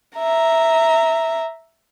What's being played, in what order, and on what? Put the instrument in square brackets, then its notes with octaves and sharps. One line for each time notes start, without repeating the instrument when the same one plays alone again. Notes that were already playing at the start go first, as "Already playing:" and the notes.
[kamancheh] E5 A#5